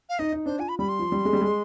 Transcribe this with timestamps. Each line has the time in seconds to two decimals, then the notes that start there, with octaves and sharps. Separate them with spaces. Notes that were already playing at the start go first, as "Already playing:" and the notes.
0.09 F5
0.19 D#4 D#5
0.32 D#4
0.46 D4 C5
0.59 F4 G#5
0.69 B5
0.79 G3 B5
0.89 C6
0.99 F3
1.12 G3
1.25 G#3
1.33 G3
1.41 G#3